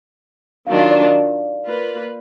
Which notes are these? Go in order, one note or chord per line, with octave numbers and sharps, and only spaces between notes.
D#3 F#3 D4 F4 F5
F5
D5
D5
A#3 F4 B4